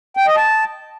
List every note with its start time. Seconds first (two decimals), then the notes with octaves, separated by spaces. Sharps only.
0.17 G5
0.27 D#5
0.37 A5